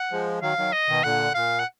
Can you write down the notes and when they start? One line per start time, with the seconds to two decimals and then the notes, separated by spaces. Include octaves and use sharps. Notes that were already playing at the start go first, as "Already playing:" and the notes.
Already playing: F#5
0.11 F3 G#3
0.42 D#3 F#3 F5
0.57 D#3 F#3
0.73 D#5
0.88 B2 D#3
1.03 A#2 D3 F#5
1.34 A#2 F5
1.59 F#5